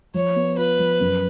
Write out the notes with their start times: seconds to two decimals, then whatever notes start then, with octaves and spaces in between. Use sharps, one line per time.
0.14 F3 C#5
0.36 B3
0.57 F4 B4
0.79 F3
1.00 F#2